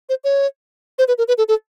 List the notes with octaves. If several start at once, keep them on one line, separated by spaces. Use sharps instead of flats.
C5
C#5
C5
B4
A#4
B4
A4
A4